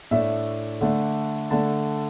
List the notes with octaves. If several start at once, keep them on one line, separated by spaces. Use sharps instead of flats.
A2 A3 D4 E5
D3 A3 D4
D3 A3 D4 A5